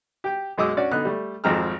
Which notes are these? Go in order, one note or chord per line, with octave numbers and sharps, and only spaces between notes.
G4 G5
B1 F#2 G#3 D#5 D6 E6
C#4 D4 F#4 C#5 D5
D3 B3 D#4 F#6
G3 A3
G#1 F2 G#3 C4 A#5 F6